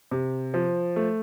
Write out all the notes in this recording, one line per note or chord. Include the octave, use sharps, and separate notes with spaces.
C3
F3
A3